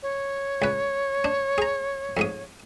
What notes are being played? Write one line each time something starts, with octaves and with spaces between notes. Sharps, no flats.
C#5
C#2 B4
D4
G#4 A#5
F2 G#2 D#6